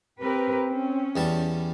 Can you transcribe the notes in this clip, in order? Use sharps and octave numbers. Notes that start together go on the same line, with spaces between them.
C4 G4 A#4 B4
C#4
E2 G3 A5